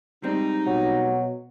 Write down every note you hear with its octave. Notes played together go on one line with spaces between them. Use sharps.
G3 G#3 C4 D#4
B2 F#3